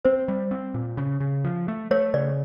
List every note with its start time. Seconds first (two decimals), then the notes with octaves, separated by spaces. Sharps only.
0.05 C4 C5
0.28 G3
0.51 C4
0.74 A#2
0.97 C#3
1.20 C#3
1.45 F3
1.68 A3
1.91 A3 C#5
2.14 C#3 D5